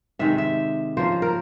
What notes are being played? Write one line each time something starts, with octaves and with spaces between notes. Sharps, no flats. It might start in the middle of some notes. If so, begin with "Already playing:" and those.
C3 D#3 G#3 E5
E5
C#3 F3 A#3 C5
A#4